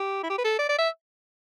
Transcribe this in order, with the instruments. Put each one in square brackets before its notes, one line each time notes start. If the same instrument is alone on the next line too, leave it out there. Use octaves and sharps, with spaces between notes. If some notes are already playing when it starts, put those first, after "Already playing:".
Already playing: [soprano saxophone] G4
E4
G4
B4
A4
D5
D5
E5